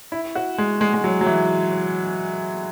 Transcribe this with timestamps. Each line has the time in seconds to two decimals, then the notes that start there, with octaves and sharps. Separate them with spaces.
0.12 E4
0.35 F#4
0.58 G#3
0.81 G#3
0.94 G#3
1.04 F#3
1.21 F#3
1.26 E3